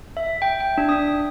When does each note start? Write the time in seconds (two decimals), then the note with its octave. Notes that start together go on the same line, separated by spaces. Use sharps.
0.17 E5
0.42 G5
0.60 G5
0.78 D4
0.89 D#6